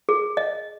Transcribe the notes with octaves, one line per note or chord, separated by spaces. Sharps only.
G#4
D#5